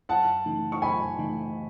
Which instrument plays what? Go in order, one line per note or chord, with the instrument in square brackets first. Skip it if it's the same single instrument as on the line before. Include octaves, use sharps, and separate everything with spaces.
[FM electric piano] F#2 [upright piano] F#5 A5
[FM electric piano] C#3 E3 A3 D#4
[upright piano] C#6
[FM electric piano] F#2 [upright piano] G#5 B5
[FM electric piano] C#3 E3 A3 D#4